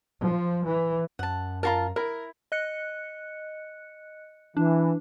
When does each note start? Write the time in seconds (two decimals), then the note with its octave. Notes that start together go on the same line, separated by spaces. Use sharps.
0.23 F3
0.66 E3
1.19 F#2 F#5 A5
1.63 F4 F#4 A#4 F5 A5 A#5
1.96 E4 A#4
2.52 D#5 F#6 C#7
4.57 E3 D4